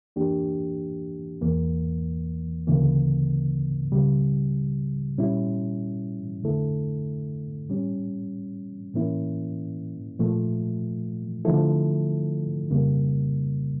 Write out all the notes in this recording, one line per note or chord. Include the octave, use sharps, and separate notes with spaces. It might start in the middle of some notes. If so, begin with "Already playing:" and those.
F2 E3 A#3 D4 G4
E2 E3 A#3
D2 C#3 E3 A#3
C#2 C#3 G3
A#2 G3 C#4 E4
F2 D3 A3 E4 A4
A2 G3 C#4
A2 E3 A#3 C#4 E4
A#2 F3 A3
D3 F3 A3 E4 A4
F2 C#3 G3 A#3